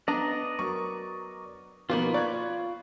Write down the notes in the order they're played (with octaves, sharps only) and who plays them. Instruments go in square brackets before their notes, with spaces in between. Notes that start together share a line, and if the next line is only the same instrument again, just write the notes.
[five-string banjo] B3 D4 A#5 [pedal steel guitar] D5 D#5
[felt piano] F#3 A#4 C#6
[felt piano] B2 F3 [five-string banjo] D#3 A#3 B3 [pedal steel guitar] F4 B5
[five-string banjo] D5 [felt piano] C#6 F#6 G#6